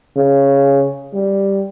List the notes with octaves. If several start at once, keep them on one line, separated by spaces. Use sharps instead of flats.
C#3
G3